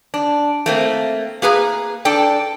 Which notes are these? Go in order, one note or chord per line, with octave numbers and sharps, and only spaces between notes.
D4
A3 A#3 C4
A#3 G#4 B4 A#5
D4 A4 G5